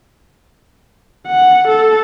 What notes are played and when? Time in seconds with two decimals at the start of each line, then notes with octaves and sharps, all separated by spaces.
1.27 F#5
1.68 A4